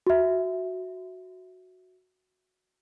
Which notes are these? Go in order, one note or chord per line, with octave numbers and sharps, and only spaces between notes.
F#4 E5